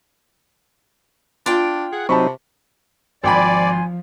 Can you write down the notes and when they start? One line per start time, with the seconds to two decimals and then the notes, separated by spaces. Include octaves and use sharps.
1.46 D4 F4 G5
1.93 G#4 F#5
2.09 C3 F#3 C4 D#4 A5 B5 C#6
3.24 G#1 F3 D5 G5 G#5 B5 C6